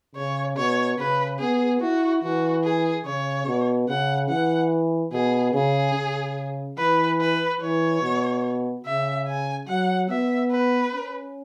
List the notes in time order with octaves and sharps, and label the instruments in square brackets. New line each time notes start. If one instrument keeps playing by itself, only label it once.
[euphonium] C#3 [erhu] C#5
[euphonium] B2 [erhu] C#5
[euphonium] C#3 [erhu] B4
[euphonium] B3 [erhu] G#4
[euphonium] E4 [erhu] F#4
[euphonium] E3 [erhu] F#4
[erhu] G#4
[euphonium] C#3 [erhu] C#5
[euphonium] B2
[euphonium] C#3 [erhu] F#5
[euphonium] E3 [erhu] F#5
[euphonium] B2 [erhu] G#4
[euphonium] C#3 [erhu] G#4
[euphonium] C#3
[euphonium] E3 [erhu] B4
[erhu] B4
[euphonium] E3 [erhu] C#5
[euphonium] B2
[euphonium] C#3 [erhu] E5
[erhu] G#5
[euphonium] F#3 [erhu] F#5
[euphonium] B3 [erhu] E5
[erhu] B4
[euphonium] C#4